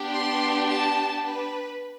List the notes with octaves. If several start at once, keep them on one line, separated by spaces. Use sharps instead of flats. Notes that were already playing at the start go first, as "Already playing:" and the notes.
Already playing: B3 D4 G4
C6
A5
B4